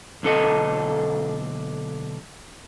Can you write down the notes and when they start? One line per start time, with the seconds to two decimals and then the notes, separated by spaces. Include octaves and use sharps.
0.23 B1 D3 A4 D#5